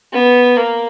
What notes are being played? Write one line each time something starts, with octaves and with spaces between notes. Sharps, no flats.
B3
A#3